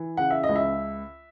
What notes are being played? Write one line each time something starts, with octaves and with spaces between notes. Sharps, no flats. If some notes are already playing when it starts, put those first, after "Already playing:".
Already playing: E3
C#3 F#5
E5
D#5
C#2
E5